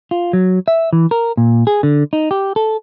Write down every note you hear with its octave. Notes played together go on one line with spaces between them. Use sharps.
F4
F#3
E5
E3
A#4
A#2
G#4
D3
D#4
G4
A4